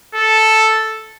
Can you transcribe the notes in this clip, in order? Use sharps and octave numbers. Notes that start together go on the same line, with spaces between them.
A4